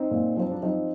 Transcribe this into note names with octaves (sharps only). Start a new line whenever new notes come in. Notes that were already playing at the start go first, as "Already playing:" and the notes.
Already playing: C4 D#4
A#2
F3 C4
D4
F3 C4 D#4